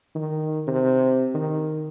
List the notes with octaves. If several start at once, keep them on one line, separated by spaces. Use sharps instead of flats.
D#3
C3
D#3